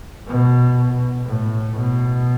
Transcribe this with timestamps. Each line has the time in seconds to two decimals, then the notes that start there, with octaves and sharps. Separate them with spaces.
0.27 B2
1.26 A2
1.75 B2